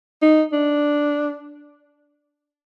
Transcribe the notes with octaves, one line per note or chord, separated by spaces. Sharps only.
D#4
D4